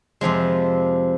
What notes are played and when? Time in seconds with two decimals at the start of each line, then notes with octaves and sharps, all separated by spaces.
0.21 F2 C3 F3 G#3